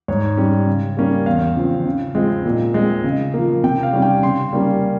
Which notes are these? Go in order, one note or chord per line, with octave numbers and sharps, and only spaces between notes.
G#2 C#5
G3 C#4
C#3
G3 A#3 C#4
E2 F5
C#3 F3 C4
C#3
F3 G#3 C4
A#2
G#3 C4
C#3
F3 A#3
C3 G5
F5
G3 C#4
G5
C#3 C6
G3 A#3 C#4